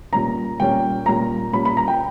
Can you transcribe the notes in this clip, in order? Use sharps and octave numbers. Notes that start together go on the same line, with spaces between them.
A#2 G3 C#4 A#5
A#2 G3 C#4 G5
A#2 G3 C#4 A#5
A#2 G3 C#4 B5
B5
A#5
G5